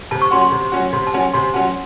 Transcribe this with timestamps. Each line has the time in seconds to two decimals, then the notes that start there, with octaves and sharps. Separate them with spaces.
0.11 C3 A5
0.22 C#6
0.31 F#3 C#4 F#4 C6
0.41 C6
0.52 C3
0.72 F#3 C#4 F#4
0.93 C3 C6
1.07 A5
1.14 F#3 C#4 F#4
1.20 G#5
1.34 C3 C6
1.54 F#3 C#4 F#4 A5